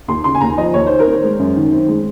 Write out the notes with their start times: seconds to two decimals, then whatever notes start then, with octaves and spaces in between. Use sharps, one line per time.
0.08 D#2 C6
0.24 C#3 C6
0.35 G#5
0.41 D#2 A#5
0.58 F3 D#5
0.74 D#2 C#5
0.87 D#3 C5
1.00 A#4
1.07 C4
1.13 C5
1.23 G#3
1.39 F#2
1.56 D#3
1.72 C4
1.88 G#3